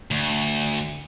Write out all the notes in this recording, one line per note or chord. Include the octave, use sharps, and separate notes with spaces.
D2